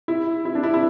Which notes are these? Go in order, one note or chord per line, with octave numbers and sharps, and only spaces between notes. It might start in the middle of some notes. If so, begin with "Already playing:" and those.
E4
E4
D4
E4
E4